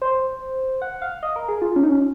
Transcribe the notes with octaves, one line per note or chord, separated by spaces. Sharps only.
C5
F#5
F5
D#5
A#4
G#4
F4
C#4
D#4
C#4